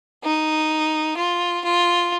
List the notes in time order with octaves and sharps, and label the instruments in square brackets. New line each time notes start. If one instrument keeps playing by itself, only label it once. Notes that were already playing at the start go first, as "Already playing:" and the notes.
[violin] D#4
F4
F4